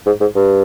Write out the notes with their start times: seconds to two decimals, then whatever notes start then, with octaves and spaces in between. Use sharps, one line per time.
0.06 G#2
0.20 G#2
0.35 G2